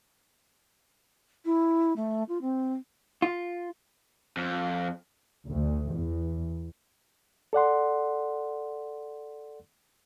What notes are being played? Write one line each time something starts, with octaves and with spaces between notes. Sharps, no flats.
E4
A3
F4
C4
F4
F2
D2
E2
A4 D5 F#5 C6